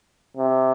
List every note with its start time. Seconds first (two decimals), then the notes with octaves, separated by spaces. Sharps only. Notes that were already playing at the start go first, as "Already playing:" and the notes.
0.37 C3